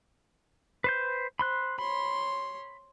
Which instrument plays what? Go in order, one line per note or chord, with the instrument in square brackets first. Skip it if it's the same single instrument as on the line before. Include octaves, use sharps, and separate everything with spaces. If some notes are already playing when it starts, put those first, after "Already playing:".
[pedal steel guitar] B4 C5 G6
[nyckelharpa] C5 [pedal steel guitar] B5 C6 F#6
[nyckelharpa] C#5 C6 [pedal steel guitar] B5